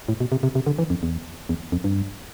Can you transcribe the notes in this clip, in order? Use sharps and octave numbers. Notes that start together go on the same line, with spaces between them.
A2
B2
C3
C3
C3
D3
E3
F2
E2
E2
F2
G2